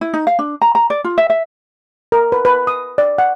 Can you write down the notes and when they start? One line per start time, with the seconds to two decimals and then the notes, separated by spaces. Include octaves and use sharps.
0.01 E4
0.14 D#4
0.27 F5
0.39 D4
0.62 A#5
0.75 A#5
0.90 D5
1.04 F4
1.18 E5
1.30 E5
2.12 A#4
2.32 B4
2.45 B4
2.67 D#6
2.98 D5
3.18 F#5